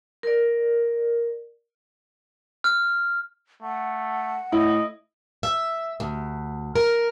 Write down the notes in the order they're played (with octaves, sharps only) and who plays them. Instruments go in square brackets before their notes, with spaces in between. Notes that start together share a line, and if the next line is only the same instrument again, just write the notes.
[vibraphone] A#4 D5
[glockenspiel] F6
[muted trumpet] A3 [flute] F#5
[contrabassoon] A2 [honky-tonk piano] E4 [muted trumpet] D#5
[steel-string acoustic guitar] E5
D2
A#4